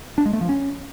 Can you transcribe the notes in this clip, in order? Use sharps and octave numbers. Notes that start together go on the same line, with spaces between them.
D4
G#3
A3
F3
C#4